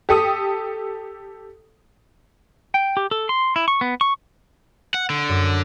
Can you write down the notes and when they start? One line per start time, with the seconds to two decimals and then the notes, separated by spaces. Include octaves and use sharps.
0.09 G4 A4 D#6
2.74 G5
2.97 G4
3.11 A4
3.29 C6
3.56 E4
3.68 C#6
3.81 B3
4.01 C#6
4.94 F#5
5.10 D3
5.29 F#2